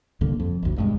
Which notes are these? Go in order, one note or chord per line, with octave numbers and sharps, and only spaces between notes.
C2 G2 D3 A#3
F2
G1 D2
E1 G2 G#3